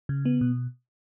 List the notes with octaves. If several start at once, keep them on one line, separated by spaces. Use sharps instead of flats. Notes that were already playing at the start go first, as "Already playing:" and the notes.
C#3
B3
B2